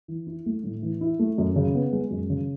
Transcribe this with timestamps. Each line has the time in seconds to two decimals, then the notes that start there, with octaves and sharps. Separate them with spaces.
0.08 E3
0.27 E4
0.46 A3
0.64 A2
0.82 E3
1.01 E4
1.19 A3
1.38 F#2
1.56 C#3
1.74 B3
1.92 G#3
2.11 F#2
2.30 C#3